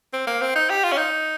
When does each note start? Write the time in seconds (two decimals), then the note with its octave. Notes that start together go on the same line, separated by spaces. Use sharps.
0.13 C4
0.27 A#3
0.42 C4
0.55 D#4
0.70 G4
0.84 F4
0.92 C#4
0.98 D#4